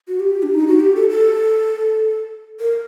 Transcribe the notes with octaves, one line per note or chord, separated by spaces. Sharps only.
F#4
G4
D4
D#4
F#4
G4
A4
A4
A#4